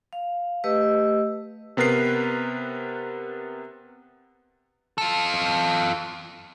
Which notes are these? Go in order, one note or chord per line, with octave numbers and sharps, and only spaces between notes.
F5
A3 G4 B4 D#5 E6
C3 B3 A#4 B4 C7
F4 A4